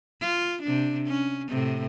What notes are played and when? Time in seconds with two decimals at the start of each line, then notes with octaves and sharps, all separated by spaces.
0.21 F4
0.63 C3 D4
1.07 C#4
1.49 A2 C3